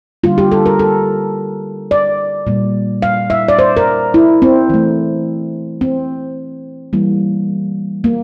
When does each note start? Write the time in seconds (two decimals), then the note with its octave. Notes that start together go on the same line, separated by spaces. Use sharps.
0.23 D3 G3 A#3 F4
0.38 G4
0.52 A4
0.66 A#4
0.79 A4
1.91 D5
2.47 A#2 G3 A#3
3.02 F5
3.30 E5
3.48 D5
3.59 C5
3.77 A#4
4.14 E4
4.42 C4
4.70 E3 A3
5.81 C4
6.93 E3 G3 A#3
8.04 A#3